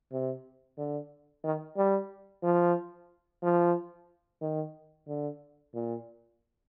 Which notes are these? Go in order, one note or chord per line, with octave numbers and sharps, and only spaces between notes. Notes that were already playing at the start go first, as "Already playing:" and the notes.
C3
D3
D#3
G3
F3
F3
D#3
D3
A#2